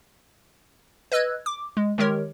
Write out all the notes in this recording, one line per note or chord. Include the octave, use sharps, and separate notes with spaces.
B4 D#5 E6 F#6 G#6
D6
G#3
D#3 G#3 G4 A#4 C#5